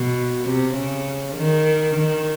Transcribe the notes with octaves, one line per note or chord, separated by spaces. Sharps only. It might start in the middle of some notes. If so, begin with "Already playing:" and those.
Already playing: B2
C3
C#3
D#3
D#3